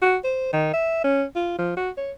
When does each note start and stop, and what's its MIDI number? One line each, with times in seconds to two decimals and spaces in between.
0.02 0.17 66
0.24 0.50 72
0.53 0.69 51
0.73 1.04 76
1.04 1.24 61
1.36 1.56 65
1.58 1.73 53
1.77 1.90 66
1.97 2.11 73